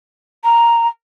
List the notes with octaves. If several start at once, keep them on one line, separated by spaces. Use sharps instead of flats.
A#5